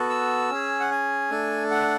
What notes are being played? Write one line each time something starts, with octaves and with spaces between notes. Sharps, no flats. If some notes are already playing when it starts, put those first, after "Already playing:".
Already playing: B3 F#4 A4
E6
C#4 G#4
F#5
G#5
A3 D4 A4
F#5